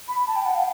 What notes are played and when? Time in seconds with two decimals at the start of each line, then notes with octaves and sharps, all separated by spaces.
0.08 B5
0.27 A5
0.36 G5
0.46 F#5
0.55 F5